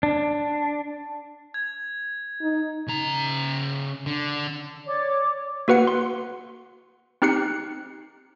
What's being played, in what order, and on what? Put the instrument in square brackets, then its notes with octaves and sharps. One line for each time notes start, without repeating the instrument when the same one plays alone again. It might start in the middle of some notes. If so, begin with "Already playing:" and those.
[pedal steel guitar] D4
[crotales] G#6
[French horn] D#4
[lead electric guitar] C#3 A#5
D3
[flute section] C#5 D5 D6
[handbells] A#3 F#4 B4 F#5 C#7
C6
C4 D#4 G4 F#6 C7 C#7